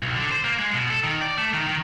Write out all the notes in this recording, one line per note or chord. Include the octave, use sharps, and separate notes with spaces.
B1
D3
C5
A#3
G#3
B2
A4
D#3
D5
A3
D#3
D#3